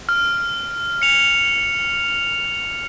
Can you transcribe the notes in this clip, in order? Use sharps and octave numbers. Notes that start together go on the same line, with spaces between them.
F6
C#7 F7